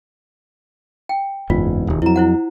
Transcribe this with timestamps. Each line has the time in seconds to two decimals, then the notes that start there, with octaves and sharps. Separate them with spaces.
1.09 G5
1.50 F#1 E2 G#2 F4
1.87 E1 D#2
2.02 F2 F#3 E4 A#5
2.16 E4 C5 F#5